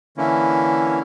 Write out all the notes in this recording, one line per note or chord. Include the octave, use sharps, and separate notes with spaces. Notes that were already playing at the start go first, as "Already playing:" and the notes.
D3 E3 A#3 C#4 E4